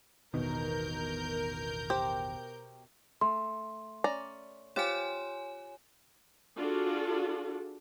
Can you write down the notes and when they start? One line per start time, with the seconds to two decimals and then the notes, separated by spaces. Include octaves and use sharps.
0.34 A1 E2 B2 D#3 A#4 G6
1.90 G4 C5
3.21 A3 C6
4.04 C#4 D5 A#5
4.76 F4 G4 C5 C#5 G#5
6.56 D4 F4 F#4 G#4 A4